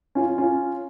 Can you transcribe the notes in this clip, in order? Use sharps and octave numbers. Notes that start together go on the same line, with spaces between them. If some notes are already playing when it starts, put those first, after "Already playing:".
C#4 F4
C#4 F4